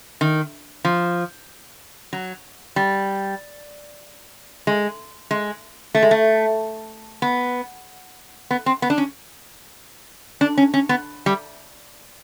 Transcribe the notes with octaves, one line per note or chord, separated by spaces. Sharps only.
D#3
F3
F#3
G3
G#3
G#3
A3
G#3
A3
B3
B3
C4
B3
D4
C#4
D4
C#4
C#4
B3
G3